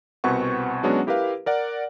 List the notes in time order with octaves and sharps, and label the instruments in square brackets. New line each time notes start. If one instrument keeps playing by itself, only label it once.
[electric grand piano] C2 B2 C4 B4 F#5 C#6
F#3 G#3 B3 C#4 D4 F#4
E4 G4 A#4 B4 F5
A#4 D5 F#5